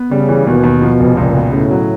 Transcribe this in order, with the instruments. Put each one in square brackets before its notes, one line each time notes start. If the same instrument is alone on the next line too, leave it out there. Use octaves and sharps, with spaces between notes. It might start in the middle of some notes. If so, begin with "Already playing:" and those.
Already playing: [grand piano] B3
[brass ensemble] C#3 [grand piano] G3
[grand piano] E3
[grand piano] D#2 [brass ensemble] B2
[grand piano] D#2
F3
F1
[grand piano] C#2 [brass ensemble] A#2
[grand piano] B2
[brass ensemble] A2 [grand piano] C#3
[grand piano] F#3